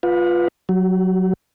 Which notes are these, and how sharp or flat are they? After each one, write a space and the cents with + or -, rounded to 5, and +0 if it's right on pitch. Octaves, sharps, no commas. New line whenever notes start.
F4 +0 B4 +0 F#5 -45
F#3 +0 G4 -45